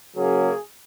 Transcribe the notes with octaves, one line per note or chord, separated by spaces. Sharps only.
C#3 F#3 A#3 C#4 G#4